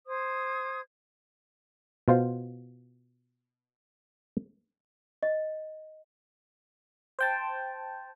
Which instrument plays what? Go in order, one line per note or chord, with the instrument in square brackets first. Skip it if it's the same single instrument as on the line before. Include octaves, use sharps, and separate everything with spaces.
[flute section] C5 D#6 G#6
[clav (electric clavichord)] B2 F4 C5 F5
[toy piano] D#5
[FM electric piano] C5 G5 A5